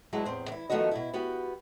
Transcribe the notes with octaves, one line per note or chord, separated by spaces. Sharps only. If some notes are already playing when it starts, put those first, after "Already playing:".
E2 F#3 G#3 E4 B4 A5
E2 A2 C4
E3 E4
D#3 F3 A3 B3 F#4 D#5
B2 E4
B3 F#4 G4